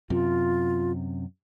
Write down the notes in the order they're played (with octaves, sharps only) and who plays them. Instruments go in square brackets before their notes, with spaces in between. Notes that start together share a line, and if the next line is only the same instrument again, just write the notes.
[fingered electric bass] F#2 C3 [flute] F4